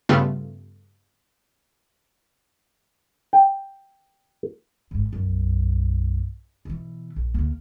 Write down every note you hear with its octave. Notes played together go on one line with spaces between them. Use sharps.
G2 C#3 G3 A3 B3 F4
G5
G#1 G#2
B1 F#2
B2 E3
A#1
D2 A#3